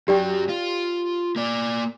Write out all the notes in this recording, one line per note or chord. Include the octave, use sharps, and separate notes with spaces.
F#2 F#3 G4 D5 G5
F4
A#3 D5